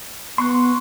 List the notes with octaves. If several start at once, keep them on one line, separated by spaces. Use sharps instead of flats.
B3 C6 C#6 F#6